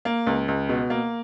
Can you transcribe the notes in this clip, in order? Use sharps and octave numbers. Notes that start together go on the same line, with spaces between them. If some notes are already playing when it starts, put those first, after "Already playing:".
A#3
C#2
C#2
B2
A#3